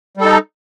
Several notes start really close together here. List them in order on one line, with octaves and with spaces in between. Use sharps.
G3 A4 D#4